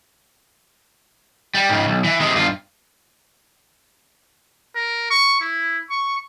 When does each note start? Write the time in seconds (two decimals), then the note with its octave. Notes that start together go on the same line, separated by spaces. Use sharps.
1.54 G3
1.69 G#2 C#3
1.88 B1
2.04 E3
2.20 C3 G#3
2.36 G2 F4
4.75 A#4
5.10 C#6
5.41 E4
5.90 C#6